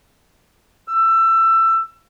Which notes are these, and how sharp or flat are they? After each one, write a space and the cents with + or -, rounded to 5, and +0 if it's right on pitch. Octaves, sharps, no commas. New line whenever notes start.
E6 +20